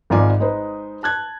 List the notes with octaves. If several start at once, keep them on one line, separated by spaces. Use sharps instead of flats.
G#1 G#2 F4 D5 G#5 D6
G#3 D#4 B4 C5
A5 F#6 G#6